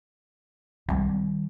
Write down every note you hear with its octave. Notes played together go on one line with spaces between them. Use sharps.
C2 D#3 G3